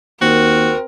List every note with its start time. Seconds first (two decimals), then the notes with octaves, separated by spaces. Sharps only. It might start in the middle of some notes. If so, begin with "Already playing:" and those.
0.21 D#2 C4 F#4 A#4